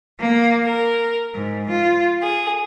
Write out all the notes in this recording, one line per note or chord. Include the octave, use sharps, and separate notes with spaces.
A#3
A#4
G#2
F4
G#4